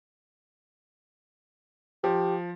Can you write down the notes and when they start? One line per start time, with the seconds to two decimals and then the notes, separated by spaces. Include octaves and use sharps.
2.04 F3 G4